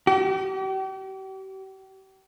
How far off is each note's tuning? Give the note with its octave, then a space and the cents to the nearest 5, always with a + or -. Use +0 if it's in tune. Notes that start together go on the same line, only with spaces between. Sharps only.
G4 -40